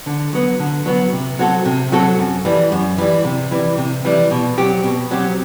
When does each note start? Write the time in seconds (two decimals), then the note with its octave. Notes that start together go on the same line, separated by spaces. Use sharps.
0.06 D3
0.33 F#3 B3
0.59 D3
0.86 F#3 B3
1.12 C3
1.39 F#3 C4 F#4 A4
1.65 C3
1.92 F#3 C4 F#4 A4
2.19 F#2
2.45 E3 G3
2.72 F#2
2.98 E3 G3
3.25 C3
3.51 E3 G3
3.78 C3
4.05 E3 G3
4.31 B2
4.58 F#3 C4 G4
4.84 B2
5.11 F#3 C4 G4